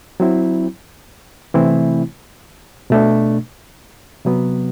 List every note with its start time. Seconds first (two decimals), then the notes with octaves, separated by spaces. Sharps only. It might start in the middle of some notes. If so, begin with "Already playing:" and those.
0.20 F#3 C4 E4
1.54 C3 E3 A3 C4 E4
2.90 B2 A3 D4
4.25 C3 F#3 B3